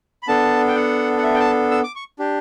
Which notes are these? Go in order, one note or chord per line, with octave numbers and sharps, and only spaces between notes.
B5
B3 D4 A4 A5
G5
F#5
F#5
E5
G5
A5
E6
D6
C#6
D4 G4